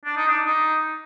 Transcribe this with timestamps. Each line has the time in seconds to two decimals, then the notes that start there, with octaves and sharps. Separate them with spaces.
0.05 D4
0.17 D#4
0.28 D4
0.45 D#4